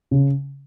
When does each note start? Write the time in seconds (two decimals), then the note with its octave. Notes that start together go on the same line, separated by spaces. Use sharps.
0.11 C#3